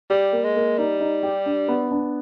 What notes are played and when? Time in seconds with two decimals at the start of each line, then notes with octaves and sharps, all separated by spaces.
0.10 G3 G4
0.33 A#3
0.44 G#3
0.56 A#3
0.78 G3 D#4
1.00 D#4
1.23 G4
1.46 D4
1.68 B3
1.91 D4